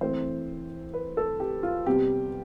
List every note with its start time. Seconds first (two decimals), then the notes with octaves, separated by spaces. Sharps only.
0.01 E3 A3 C4 C5
0.94 B4
1.17 A4
1.40 G4
1.63 F4
1.86 C3 G3 B3 G4